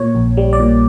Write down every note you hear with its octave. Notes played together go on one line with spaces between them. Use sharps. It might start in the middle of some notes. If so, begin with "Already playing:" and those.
Already playing: A#2 C#5
A#1
G3
D5
A#2